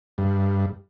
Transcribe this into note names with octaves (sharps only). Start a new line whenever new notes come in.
G2